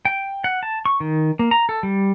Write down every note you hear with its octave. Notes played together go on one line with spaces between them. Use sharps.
G5
F#5
A5
C#6
D#3
A#3
A#5
A4
G3